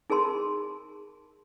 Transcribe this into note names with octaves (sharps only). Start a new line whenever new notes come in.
D#4 G#4 A#4 A5 C6